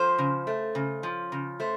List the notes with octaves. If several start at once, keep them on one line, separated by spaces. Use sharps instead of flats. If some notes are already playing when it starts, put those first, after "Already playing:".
Already playing: F3 C5
C#3
A3
C#3
F3
C#3
A3 C5